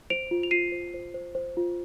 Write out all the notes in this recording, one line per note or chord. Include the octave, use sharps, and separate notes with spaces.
C5 D7 F7
F4
F7
F4 C7 D#7
C5
C5
C5
C5
F4